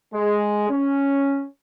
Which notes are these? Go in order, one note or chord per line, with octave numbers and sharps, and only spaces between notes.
G#3
C#4